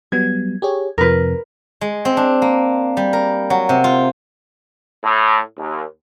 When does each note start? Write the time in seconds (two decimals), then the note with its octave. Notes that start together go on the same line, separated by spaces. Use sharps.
0.12 F#3 G3 B3 G#6
0.62 G4 G#4 C#5
0.98 F2 C3 F3 A#4 B4
1.81 G#3
2.05 C4
2.17 D4
2.42 A#3
2.97 G3
3.13 A#4
3.50 F#3
3.69 C3
3.84 F4
5.04 A2
5.57 D#2